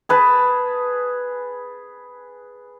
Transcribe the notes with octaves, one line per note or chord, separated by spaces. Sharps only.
G#4 B4 A5